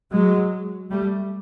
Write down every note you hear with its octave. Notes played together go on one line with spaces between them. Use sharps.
F#3 G#3
G3 A3